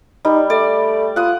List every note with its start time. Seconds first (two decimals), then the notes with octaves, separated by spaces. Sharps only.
0.25 G3 D#4
0.50 A3 D5
1.16 F4 F#5 D#6